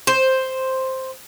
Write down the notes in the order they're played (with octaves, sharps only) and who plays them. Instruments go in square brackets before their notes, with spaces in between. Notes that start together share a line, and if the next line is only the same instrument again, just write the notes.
[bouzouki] C5